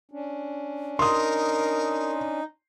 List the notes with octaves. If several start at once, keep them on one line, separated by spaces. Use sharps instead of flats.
C#4 D4
D#4 A#4 C6 D#6